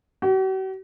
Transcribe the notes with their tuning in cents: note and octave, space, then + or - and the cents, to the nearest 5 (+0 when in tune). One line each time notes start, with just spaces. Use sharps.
F#4 +45